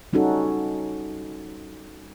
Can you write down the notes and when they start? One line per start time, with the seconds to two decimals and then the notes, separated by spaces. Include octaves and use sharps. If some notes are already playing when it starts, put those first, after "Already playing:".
0.13 G3 C#4 D#4 F#4 A4